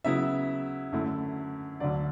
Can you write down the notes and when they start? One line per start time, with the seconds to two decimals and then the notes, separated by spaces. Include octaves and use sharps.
0.05 C#3 F#3 B3 E4 E5
0.92 F#2 D3 A3 E4
1.80 D2 D3 F#3 D5